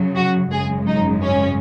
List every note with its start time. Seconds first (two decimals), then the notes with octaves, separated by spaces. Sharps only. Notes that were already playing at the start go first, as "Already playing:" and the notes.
Already playing: F#2 C#3 F#3
0.16 F#4
0.51 G#1 F#2 C#3 G#3 G#4
0.87 D#4
1.23 C#4